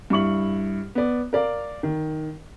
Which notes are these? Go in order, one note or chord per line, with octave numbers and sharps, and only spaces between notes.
G2 E4 C#6 F#7
B3 D5
A#4 D5 F5
D#3